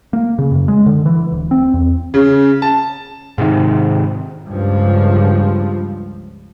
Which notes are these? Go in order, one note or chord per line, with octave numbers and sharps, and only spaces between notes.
A#3
C#3
F#2
G#3
D3
E3
D1
C4
E2
C#3
A5
G#2 C3 D#3
C#2 G2 F3